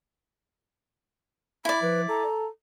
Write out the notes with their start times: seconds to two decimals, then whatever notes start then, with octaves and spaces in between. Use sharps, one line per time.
1.65 E4 D5 B5
1.82 F3 B4
2.09 A4 A#5